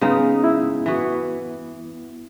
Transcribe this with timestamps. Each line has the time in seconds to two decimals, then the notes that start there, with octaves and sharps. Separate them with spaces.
0.01 C#3 G#3 B3 D#4
0.44 E4
0.86 E3 B3 F#4